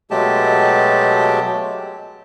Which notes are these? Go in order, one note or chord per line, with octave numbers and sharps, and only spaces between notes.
B2 F#3 G#3 A3 G4 A5